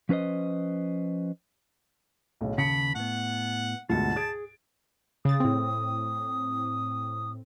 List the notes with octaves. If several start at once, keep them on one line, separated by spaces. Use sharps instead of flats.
F3 C#4 B4 C5 D#5
B1 A2 C#3
D#2 C#3 A5 B5 C7 C#7
A2 B3 F#5
D2 G#2 B2 F4 F#5 A5
G#4 G#6 A6 D7
C#3 D#6 A6
A2 C4